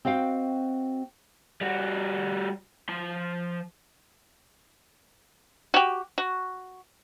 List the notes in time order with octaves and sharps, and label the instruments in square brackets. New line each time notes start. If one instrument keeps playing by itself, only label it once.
[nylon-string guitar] C4 F#4 D#5 F5 G5
[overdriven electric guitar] G3 F#4
F3 C6
[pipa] F#4 G4
F#4